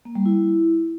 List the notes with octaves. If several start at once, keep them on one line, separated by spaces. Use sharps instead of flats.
A#3
G3
E4